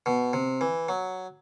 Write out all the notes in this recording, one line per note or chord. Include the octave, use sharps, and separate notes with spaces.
B2
C3
E3
F#3